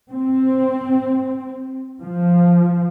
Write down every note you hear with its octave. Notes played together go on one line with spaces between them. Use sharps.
C4
F3